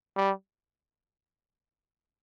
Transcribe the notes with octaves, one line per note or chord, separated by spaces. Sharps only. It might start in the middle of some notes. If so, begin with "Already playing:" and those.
G3